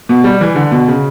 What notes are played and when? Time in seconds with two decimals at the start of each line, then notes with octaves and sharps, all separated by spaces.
0.09 B2
0.24 G3
0.41 E3
0.56 D3
0.72 B2
0.88 C#3